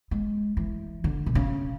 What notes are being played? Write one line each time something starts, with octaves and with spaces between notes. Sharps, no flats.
G#3
E3
D3
B2
C#3